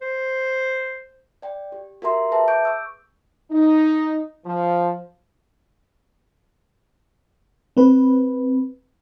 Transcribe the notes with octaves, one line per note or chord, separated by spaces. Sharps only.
C5
D5 G5
G4
F#4 G4 A#4 E5 A#5 C6
G#4 B4 E5 A5
C#6 D6 G6 D7
C#6 E6
D#4
F3
C4 B4